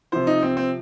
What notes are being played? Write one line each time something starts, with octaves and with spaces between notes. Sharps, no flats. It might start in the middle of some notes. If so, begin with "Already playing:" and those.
C3 F3 C5
D#4
C4
C4